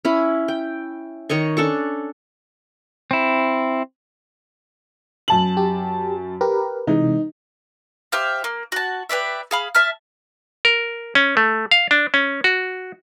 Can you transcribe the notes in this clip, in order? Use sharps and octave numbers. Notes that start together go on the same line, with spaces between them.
C#4 E4 B5
G5
D#3 C#5 D#5 C#6
C#4 D4 A4 C#6
C4 E4
F#2 A5 F#7
G4
G4 A#4 B4
C3 E3 G#3 D#4
G4 C5 E5 F5
A#3
F#4 A5
G4 B4 D5 E5
G#4 F5 B5
E5 A5 F6
A#4
C#4
A3
F5
D4
C#4
F#4